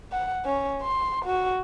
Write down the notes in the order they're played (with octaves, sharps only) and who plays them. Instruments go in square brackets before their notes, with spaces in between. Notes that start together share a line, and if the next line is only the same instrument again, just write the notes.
[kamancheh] F#5
C#4
C6
F#4